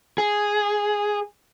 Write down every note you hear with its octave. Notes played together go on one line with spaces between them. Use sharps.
G#4